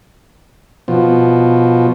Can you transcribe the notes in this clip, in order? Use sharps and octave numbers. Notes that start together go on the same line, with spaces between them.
B2 F3